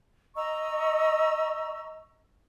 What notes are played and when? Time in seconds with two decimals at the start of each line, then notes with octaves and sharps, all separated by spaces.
0.35 D#5 A#5 C#6 E6